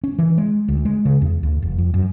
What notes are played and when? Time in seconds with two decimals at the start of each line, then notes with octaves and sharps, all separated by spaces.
0.04 C#4
0.18 E3
0.37 G#3
0.68 D2
0.85 G#3
1.05 C#3
1.22 E2
1.43 D2
1.62 F1
1.78 F2
1.94 F#2